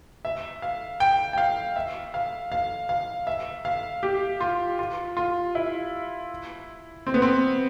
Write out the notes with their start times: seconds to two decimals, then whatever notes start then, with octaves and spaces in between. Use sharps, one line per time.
0.25 E5
0.62 F5
1.00 G5
1.33 G5
1.38 F5
1.76 E5
2.14 F5
2.52 F5
2.89 F5
3.27 E5
3.65 F5
4.03 G4
4.41 F4
4.79 F4
5.17 F4
5.55 E4
7.07 C4
7.14 B3
7.22 C4